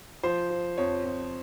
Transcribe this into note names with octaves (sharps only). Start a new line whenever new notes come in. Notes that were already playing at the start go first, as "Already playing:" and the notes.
F3 C5
F3
F2 C#5
F2